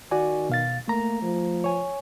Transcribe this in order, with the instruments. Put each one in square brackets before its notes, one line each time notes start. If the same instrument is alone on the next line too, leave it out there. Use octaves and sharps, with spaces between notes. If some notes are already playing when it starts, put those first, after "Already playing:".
[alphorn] D#3 [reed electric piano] F#4 D5 G#5
[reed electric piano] B2 F5 A6
[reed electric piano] A3 A#5 [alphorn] A#3
[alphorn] F3
[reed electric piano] C#5 G#5